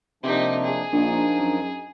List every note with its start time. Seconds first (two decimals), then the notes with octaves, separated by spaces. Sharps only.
0.23 C3 F3 A#3 D4 D#4 G4
0.64 G#4
0.92 A#1 F3 D4 D#4 A#4
1.39 F#2